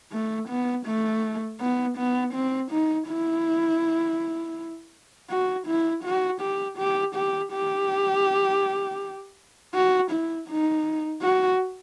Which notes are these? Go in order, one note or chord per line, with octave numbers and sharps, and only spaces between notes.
A3
B3
A3
B3
B3
C4
D#4
E4
F#4
E4
F#4
G4
G4
G4
G4
F#4
E4
D#4
F#4